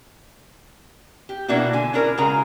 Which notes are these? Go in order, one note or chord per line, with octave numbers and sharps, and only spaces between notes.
G4
B2 A#3 D4 E4 F#4
D3 G#5
C#4 D4 E4 A#4
C#3 G#3 F#4 A#4 A#5